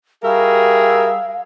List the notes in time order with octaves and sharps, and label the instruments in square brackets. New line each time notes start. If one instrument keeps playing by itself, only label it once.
[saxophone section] G3 F#4 E5 [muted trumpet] G#4 [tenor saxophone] A#4 [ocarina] F5